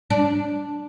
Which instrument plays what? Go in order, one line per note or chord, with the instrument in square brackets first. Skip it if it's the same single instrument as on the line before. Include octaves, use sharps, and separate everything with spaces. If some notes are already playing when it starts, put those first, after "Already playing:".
[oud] D4